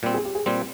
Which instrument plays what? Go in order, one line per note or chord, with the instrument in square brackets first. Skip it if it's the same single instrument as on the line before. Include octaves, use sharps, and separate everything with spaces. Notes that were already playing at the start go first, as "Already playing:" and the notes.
[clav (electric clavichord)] A#2 G3 C4 [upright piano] G4
[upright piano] G#4
G4
G#4
[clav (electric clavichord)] A#2 G3 C4